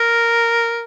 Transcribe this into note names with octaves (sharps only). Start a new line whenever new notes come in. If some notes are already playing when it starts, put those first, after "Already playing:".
Already playing: A#4